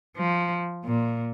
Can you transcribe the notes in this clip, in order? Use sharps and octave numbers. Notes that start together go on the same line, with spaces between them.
F3
A#2